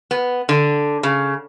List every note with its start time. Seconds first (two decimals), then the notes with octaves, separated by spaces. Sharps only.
0.11 B3
0.49 D3
1.03 C#3